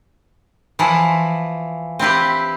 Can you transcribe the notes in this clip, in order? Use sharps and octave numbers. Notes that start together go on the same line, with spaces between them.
E3 F3 E4
C4 E4 G4 B4